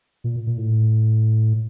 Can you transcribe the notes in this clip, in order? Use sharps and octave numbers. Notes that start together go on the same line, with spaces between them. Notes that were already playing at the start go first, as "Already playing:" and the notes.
A#2
A#2
A2